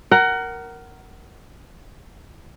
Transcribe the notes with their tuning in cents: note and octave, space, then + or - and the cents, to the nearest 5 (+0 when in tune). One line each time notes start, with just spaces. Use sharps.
A#4 +0 F#5 +25